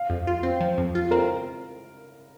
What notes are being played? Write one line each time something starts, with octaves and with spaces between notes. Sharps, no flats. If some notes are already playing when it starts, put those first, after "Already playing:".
Already playing: F5
F2
F4
C4
F3
F2
F4
C4 A#4